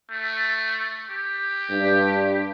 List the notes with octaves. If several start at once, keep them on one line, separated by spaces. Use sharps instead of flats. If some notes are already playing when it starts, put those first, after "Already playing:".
A3
G4
G2